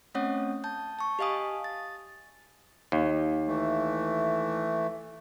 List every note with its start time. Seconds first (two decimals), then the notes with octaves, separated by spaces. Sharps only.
0.15 A3 C4 C#4 C#5 F#5 D#6
0.64 A5 G6
0.99 A5 C#6
1.19 G4 D#5 F5 G#5 D#6
1.64 A6
2.92 D#2
3.48 E3 A3